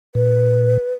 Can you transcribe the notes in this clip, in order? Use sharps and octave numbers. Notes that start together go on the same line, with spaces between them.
A#2 B4